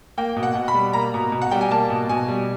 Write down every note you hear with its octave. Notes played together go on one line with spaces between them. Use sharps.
A#3 G5
B2
F#5
B2
B5
G3
A#3 A#5
B2
B2
F#5
G3 G5
G#5
A#3 A5
B2
B2 G#5
G3